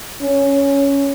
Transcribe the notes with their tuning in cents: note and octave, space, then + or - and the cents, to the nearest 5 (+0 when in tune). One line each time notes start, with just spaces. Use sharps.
C#4 +5